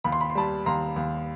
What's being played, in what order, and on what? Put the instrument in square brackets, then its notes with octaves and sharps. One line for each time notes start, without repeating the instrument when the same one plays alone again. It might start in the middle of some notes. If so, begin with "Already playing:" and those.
[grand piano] D#2 B5
C6
B5
C6
G3 A5 B5
D#2 A#5 C6
D#2